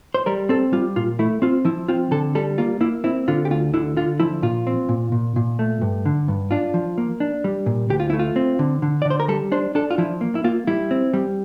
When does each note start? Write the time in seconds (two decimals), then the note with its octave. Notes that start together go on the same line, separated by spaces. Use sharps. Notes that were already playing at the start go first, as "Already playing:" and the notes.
0.14 C5
0.26 G3 A#4
0.49 C4 A4
0.73 G3 F4
0.96 A#2 F4
1.19 A3 E4
1.42 C4 F4
1.65 F3 E4
1.88 C4 F4
2.11 D3 A4
2.35 G3 A4
2.58 A#3 F4
2.81 A#3 E4
3.04 C4 E4
3.28 D3 F4
3.45 G4
3.51 D2 F4
3.74 D3 E4
3.97 D3 F4
4.20 F3 E4
4.42 A#2 F4
4.67 C4
4.89 A#2
5.12 A#2
5.36 A#2
5.59 A3
5.82 G2
6.06 D3
6.28 G2
6.51 D4 F4
6.74 F3
6.98 A#3
7.20 D4
7.44 G3
7.66 A#2
7.90 D2 G4
8.00 F4
8.10 A3 E4
8.19 F4
8.36 C4
8.59 D3
8.82 D3
9.02 D5
9.05 D3
9.10 C5
9.20 A#4
9.28 G3 A4
9.52 D4 C5
9.75 D4 A4
9.91 F4
9.98 F3 E4
10.21 A#3
10.35 E4
10.44 A#3 F4
10.67 G3 E4
10.91 C4
11.13 G3